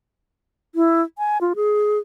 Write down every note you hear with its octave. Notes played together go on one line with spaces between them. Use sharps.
E4
G#5
F4
G#4